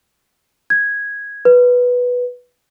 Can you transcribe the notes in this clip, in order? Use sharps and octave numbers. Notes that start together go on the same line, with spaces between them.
G#6
B4